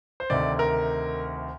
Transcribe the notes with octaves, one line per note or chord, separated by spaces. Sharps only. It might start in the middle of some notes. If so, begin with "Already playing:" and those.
C5
D2 C3 D#3 D5
A#4